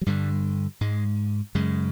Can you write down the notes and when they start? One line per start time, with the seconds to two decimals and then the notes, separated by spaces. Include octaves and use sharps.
0.01 F#3
0.06 G2 D3 G3
0.81 G#2 G#3
1.55 F#2 C#3 G#3